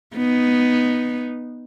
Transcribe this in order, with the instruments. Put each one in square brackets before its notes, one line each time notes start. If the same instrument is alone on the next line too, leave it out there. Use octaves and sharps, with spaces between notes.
[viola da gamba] B3 D#4